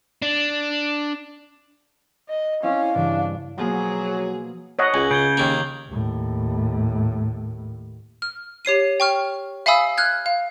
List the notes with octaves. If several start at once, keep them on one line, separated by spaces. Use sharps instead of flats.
D4
D#5
C4 C#4 E4 D5 F5
G2 C#3 E3 D4
B2 F3 F#3 A#3 G#4
C#5 D#5 F#5
C#2 G#5 F#7
C#3 G6 G#6 G7
D#2 A#3
D#2 A2
F6
G4 C#5 C7 D#7
G5 C#6 F6
E5 F5 G#5 B5 D#6 E6
F6 F#6 G#6
F5